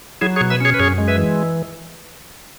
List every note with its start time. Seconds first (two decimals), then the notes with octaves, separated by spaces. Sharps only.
0.21 F#3 E4 G#4
0.36 G#4 C#5
0.41 B2
0.50 B4 E5
0.60 C#4 G#4 C#5
0.74 B4
0.79 F#2 G#4 C#5
0.98 G#3
1.08 B4 E5
1.18 E3